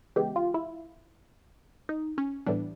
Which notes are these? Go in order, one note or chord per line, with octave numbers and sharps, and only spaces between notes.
C#3 E3 G#3 B3 G4
F4
E4
D#4
C#4
A2 E3 G3 B3 D4